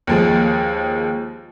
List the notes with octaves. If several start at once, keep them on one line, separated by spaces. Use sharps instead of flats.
D#2 F3 G#3